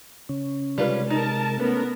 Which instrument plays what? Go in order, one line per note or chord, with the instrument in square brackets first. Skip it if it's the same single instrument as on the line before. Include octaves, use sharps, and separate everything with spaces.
[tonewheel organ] C#3 C#4
[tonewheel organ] C3 G#3 [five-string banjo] G3 F4 B4 [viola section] C#4
[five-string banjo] D#4 [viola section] A#4 A5
[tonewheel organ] A3 C#4 B4 [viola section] B3 A#4